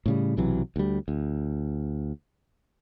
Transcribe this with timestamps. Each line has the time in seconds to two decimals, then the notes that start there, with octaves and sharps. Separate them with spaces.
0.06 A2 C#3 G3
0.37 B1 C3 E3 F#3
0.76 D2 G3
1.08 D2